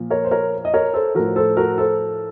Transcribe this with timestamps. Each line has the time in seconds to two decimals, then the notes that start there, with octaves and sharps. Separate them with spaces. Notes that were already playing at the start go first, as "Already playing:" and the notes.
Already playing: A#2 F3
0.10 A#4 C#5
0.25 C5
0.31 A#4 C#5
0.65 D#5
0.74 A#4 C#5
0.94 A4 C5
1.15 A2 F3 F#4 A#4
1.36 A4 C5
1.57 F#4 A#4
1.78 A4 C5